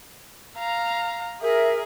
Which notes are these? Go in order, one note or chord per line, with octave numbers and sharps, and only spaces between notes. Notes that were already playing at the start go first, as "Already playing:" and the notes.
F5 A#5
G#4 A#4 E5